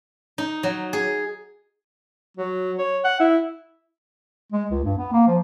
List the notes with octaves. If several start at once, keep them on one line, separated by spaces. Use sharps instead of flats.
D#4
F#3
G#4
F#3
C#5
F#5
E4
G#3
C#2
G2
B3
A#3
F3